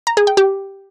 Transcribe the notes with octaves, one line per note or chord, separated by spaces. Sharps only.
A#5
G#4
G5
G4